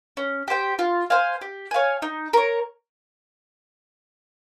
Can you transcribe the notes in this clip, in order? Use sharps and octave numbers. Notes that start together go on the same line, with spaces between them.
C#4
G4 C5 G5
F4
C5 F5 G#5
G4
C#5 F5 G#5
D#4
A#4 C#5